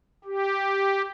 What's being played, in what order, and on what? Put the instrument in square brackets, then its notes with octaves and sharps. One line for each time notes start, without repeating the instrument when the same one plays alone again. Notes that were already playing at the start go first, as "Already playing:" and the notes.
[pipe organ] G4